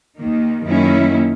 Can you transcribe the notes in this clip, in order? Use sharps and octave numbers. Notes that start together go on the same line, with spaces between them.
D#2 D#3 A#3
F#2 D#3 A#3 C#4 E4